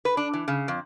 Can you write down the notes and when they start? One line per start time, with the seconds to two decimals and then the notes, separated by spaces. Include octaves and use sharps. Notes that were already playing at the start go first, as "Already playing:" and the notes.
0.05 B4
0.17 D4
0.33 E3
0.48 C#3
0.68 F2